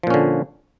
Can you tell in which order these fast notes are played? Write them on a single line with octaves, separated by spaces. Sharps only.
F3 A#2 C#4 D3